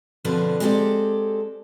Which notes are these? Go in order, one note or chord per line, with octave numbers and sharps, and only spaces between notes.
B2 D3 F3 C4 D4 B4
G#3 B3 C4 G4 A4 D5